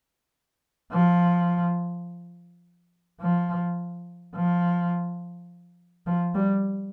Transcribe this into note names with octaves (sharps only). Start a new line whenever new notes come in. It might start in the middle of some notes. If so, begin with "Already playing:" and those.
F3
F3
F3
F3
G3